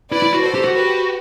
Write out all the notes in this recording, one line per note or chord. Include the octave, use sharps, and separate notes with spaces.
E4 B4 D5
E4
F#4
A4 C5
G4
F#4
G4 B4